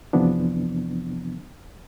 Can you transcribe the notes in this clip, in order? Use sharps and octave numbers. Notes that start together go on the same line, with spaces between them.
F2 C3 E3 F3 B3 D4